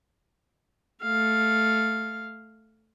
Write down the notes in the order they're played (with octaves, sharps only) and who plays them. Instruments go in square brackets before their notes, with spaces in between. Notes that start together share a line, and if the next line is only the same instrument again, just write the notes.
[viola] A3 F5